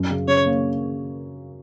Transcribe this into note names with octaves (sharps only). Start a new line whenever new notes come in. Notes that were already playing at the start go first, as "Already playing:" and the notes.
Already playing: F#2
C#3
C#3 C#5
A#3